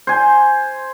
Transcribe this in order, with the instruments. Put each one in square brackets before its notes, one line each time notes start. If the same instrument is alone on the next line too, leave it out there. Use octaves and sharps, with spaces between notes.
[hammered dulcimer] C5 G#5